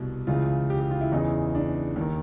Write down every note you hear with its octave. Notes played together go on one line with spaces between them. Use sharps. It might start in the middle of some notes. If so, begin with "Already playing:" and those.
Already playing: C2 B2
C#2 C#3 E3 F4
G4
G4
F4
E4
E2 C#3 E3 D#4
D4
D#2 D#3